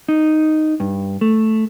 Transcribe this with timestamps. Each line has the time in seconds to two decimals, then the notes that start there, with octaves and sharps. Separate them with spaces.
0.08 D#4
0.80 G2
1.21 A3